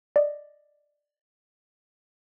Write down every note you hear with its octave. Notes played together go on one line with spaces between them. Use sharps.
D5 D#5